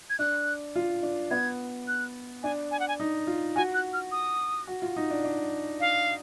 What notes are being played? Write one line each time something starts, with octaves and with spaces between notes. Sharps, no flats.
G#6
D4 F#6
F4
D4
B3 G#6
F#6
D4 G#5
G#5
F#5
G#5
D#4
F4
F#4 G#5
F#6
F6
D#6
F#4
F4
D#4
D4
D4
F5